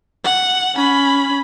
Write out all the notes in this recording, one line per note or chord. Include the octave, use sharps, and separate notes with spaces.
F#5
C#4 B5